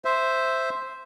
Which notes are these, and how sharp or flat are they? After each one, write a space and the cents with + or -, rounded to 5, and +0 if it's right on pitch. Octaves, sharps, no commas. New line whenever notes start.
C5 +0 E5 +0